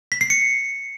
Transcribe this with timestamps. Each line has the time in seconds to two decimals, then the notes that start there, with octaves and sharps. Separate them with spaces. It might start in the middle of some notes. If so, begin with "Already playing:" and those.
0.12 B6
0.21 C7
0.30 C#7